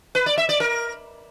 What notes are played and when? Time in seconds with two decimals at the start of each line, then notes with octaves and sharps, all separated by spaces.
0.15 B4
0.26 D5
0.38 E5
0.49 D5
0.60 A#4